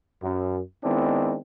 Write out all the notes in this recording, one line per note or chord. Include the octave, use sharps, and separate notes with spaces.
F#2
D#3 G#3 B3 C4 D4 E4